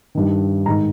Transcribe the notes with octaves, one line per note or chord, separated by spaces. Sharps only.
G2 D#3
G#2 D#3 A#5